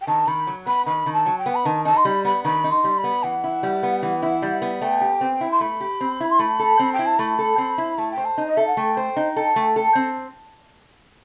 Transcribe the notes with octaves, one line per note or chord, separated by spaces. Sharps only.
G5
D#3 A5
D#3 B5
F#3
B3 B5
D#3 B5
D#3
A5
F#3
G5
B3
B5
D#3 A5
D#4 A5
C6
G3 B5
B3 B5
D#3 B5
D#4
C6
G3
B5
B3
E3 F#5
E4
G3
B3
E3
E4
G3
B3
A3 G5
G4
C4
E4
C6
A3 B5
G4
C4
E4
C6
A3 B5
A4
C4
G5
E4
A5
A3 B5
A4
C4
E4
A3 A5
G5
C5
A5
D#4
D#5
A4 E5
F#5
A3 G5
C5
D#4
A4
A3
A4
C4